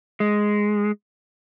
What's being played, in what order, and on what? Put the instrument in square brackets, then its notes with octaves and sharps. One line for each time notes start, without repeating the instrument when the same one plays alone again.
[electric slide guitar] G#3